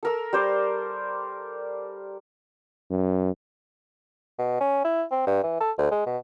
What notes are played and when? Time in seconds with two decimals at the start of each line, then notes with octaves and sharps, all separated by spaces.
0.03 A4 A#4 E6
0.33 G3 C5 D5
2.90 F#2
4.39 B2
4.61 C#4
4.84 E4
5.11 C4
5.27 G2
5.44 E3
5.61 A4
5.78 D2
5.91 G#3
6.06 B2